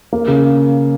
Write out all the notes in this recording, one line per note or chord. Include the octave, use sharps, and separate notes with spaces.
A#3
C#3